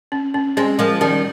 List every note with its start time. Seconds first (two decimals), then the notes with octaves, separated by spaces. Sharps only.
0.12 C#4
0.34 C#4
0.57 G#3 C4 C#4
0.79 F3 G#3 A#4
1.01 D#3 G3 C#4